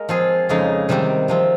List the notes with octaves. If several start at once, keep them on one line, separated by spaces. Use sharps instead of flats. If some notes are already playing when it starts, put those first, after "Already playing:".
Already playing: G#3 A#3 A#4
F3 C4 F4 G#4
F2 C#3 G#3 D#4
C3 D#3 G3 C4 G4
C3 F3 C4